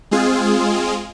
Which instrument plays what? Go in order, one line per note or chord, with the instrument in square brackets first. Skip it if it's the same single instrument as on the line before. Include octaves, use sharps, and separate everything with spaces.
[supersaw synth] G#3 C4 F4 G#4